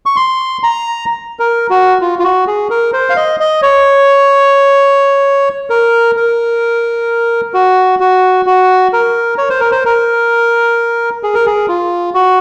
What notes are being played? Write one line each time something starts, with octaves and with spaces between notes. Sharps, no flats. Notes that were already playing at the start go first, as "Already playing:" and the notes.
C#6
C6
A#5
A#4
F#4
F4
F4
F#4
G#4
A#4
C5
F5
D#5
D#5
C#5
A#4
A#4
F#4
F#4
F#4
A#4
C#5
C5
A#4
C5
A#4
G#4
A#4
G#4
F4
F#4